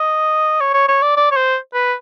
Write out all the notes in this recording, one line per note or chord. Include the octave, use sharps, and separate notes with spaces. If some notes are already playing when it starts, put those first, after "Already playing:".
Already playing: D#5
C#5
C#5
C#5
D5
D5
C#5
C5
B4